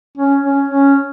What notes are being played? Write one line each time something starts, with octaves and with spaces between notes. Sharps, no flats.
C#4
C#4
C#4